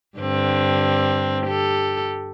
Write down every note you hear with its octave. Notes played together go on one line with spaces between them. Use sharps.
G2 D3 C4
G4 A4